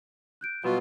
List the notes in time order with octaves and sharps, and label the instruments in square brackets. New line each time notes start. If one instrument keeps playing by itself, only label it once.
[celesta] F#6 G6 D7
[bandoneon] B2 F4 [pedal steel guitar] F#3 G3 B3 [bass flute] F#4 [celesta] B4